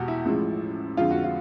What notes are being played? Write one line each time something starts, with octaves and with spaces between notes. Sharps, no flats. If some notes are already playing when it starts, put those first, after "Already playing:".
Already playing: E2 B2 G#3 F#4 G4
E4
A1 A2 F3 G#3
F2 D3 F3 G#3 F4
F#4
F4